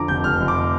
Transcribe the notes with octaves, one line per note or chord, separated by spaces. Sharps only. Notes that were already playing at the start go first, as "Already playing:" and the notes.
Already playing: F2 D3 A#5 D6
F1 G6
F1 F6
F1
D6